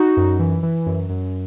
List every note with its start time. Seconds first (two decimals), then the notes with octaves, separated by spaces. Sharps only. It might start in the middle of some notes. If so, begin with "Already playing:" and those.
Already playing: D#4 F#4
0.17 F#2
0.39 E3
0.63 E3
0.86 F#2
1.10 F#2